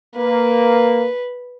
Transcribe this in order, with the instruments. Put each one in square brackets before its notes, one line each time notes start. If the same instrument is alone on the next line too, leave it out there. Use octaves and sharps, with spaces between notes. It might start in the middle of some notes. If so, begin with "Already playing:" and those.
[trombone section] A#3 [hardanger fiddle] B4